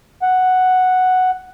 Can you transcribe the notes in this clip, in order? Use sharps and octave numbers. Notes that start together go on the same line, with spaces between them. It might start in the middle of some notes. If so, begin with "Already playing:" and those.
F#5